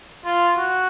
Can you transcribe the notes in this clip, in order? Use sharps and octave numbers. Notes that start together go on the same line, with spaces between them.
F4
F#4